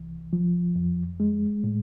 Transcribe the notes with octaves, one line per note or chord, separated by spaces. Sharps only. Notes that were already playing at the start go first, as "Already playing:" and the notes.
Already playing: C2 E3
F3
F2
G#3
A2